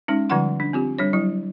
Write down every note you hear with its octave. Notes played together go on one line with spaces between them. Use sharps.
G#3 C#4 D#4
D3 F3 G3 F4 F#5 C6
D4
C4 F4 G4
G3 D4 C#5
F#3 G3 E4